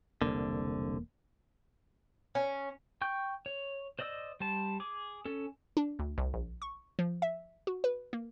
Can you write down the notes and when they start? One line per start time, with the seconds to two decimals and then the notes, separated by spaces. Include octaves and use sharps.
0.22 E1 C2 D3 A#3
2.35 C#4
3.02 G5 C#6 G6
3.46 C#5
3.99 C5 D5 D#5 D#6 E6
4.40 G3 C5 A5
4.80 G#4 D6
5.25 C#4 A4
5.77 D4
5.99 D2
6.18 C2
6.34 A#1
6.62 C#6
6.99 F3
7.22 E5
7.67 F#4
7.84 B4
8.13 A#3